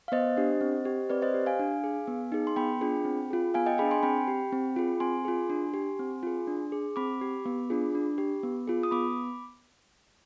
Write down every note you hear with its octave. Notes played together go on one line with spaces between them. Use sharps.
F5
B3 C5 D#5
D4 G4
C4
G4
C4 B4 D5
C5 D#5
G4
F5 G#5
D4
G#4
B3
D#4 G#4
C6
B3 G5 B5
D4 F4 G#4
C4
F4 G#4
B3 F5 G#5
D#5 G5
D4 G#4 G5 B5
G#5 C6
C4 G5 B5
G4
C4
F4 G#4
C4 G#5 C6
F4 G#4
D4
G4
C4
F4 G#4
D4
G#4
C4 B5 D6
G4
B3
D4 F4 G#4
D4
G4
B3
F4 G#4
D#6
B3 B5 D6